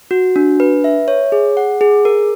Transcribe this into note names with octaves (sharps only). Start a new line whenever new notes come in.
F#4
D4
B4
E5
C#5
G#4
F#5
G#4
A#4